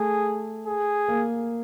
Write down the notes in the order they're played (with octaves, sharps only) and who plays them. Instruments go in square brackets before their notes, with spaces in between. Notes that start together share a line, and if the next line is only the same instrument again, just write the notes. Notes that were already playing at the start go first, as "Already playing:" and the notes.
Already playing: [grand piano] A3 [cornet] G#4
[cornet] G#4
[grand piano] A#3